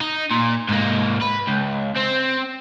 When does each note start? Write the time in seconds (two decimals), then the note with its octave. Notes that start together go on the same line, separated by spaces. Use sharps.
0.01 D#4
0.31 A#2
0.69 G#2 A#3
1.21 B4
1.47 C#2
1.96 C4